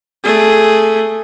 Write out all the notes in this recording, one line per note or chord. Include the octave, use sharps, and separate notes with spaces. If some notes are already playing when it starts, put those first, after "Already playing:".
A3 G#4